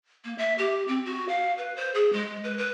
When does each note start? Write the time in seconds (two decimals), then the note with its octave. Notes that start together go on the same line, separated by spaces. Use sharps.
0.25 A#3
0.38 E5
0.58 G4
0.88 C4
1.06 F#4
1.29 F5
1.58 B4
1.76 C5
1.94 G#4
2.13 G#3
2.44 B4
2.58 B4